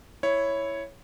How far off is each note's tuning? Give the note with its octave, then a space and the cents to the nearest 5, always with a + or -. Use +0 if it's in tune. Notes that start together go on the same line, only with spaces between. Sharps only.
E4 +0 C#5 +0